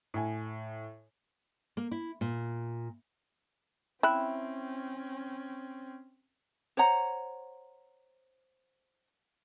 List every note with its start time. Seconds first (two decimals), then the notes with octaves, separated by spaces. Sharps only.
0.14 A2 G#5
1.77 A#3
1.91 E4
2.21 A#2
4.03 C4 C#4 E4 G5 B5 F#6
6.77 C5 C#5 F#5 A#5